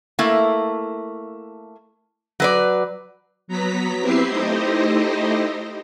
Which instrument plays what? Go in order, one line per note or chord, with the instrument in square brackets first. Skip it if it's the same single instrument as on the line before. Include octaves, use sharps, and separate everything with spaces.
[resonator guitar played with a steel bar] A3 A#3 E4
F#3 B4 D5
[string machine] F#3 B3 A#5 B6
C4 E4 G4 B4 E5 C7
A3 D#4 E4 G4 C5 D#5